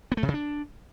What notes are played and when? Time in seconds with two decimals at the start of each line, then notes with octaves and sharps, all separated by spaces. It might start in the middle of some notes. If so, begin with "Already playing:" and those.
0.12 B3
0.17 A3
0.23 C3
0.28 C#3
0.34 D4